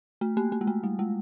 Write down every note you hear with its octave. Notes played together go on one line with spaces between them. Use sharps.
A3
A#3
A#3
G#3
A3
G3
G#3